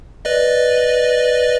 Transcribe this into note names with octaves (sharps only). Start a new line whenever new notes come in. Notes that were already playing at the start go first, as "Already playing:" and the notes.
B4 D5 D#5